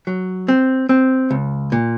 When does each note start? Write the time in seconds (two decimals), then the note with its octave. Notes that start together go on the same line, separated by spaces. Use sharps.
0.07 F#3
0.48 C4
0.89 C4
1.31 C#2
1.72 A#2